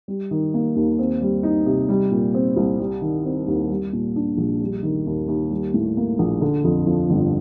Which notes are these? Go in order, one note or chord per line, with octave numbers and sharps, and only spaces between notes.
G3
D#3
A#3
D#2
C4
G3
D#4
C3
G3
A#2
C4
C2
G3
D#3
C4
D#2
G3
A#2
D4
A#1
G3
D#3
D#2
D#2
G3
A2
A#3
A#1
D3
F2
F3
G1